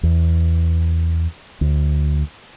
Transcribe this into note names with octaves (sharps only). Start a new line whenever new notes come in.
E2
D2